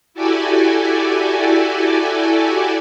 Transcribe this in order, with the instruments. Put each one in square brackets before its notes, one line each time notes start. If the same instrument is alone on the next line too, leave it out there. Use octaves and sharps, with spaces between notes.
[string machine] E4 F#4 G4 A4 D5 G#5